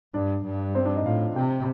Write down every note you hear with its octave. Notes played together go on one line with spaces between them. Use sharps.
G2 D4 D5
G2
C4 C5
D4 D5
D#4 D#5
A2 F4 F5
C3 G4 G5